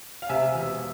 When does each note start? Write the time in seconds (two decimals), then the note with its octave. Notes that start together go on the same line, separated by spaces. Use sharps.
0.22 F5
0.29 C3 E5 G#5
0.54 E1